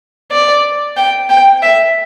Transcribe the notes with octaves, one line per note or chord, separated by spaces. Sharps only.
D5
G5
G5
E5